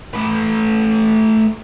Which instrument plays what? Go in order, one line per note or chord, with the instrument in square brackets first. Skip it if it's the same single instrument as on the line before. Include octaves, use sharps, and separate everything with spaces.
[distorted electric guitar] A3 B4